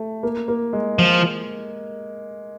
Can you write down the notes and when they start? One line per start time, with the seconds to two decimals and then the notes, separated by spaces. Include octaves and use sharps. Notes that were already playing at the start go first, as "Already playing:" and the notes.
Already playing: A3
0.23 A#3
0.48 A#3
0.73 G#3
0.99 F3